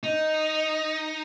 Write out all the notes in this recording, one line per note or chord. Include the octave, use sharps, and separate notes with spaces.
D#4